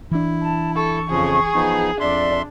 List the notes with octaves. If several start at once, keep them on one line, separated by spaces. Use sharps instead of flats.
E3 D4 E4
A5
A4 C#6
F2 C#3 F3 G#4
F3 B3 D#4
F2 D4 D5 E5 C6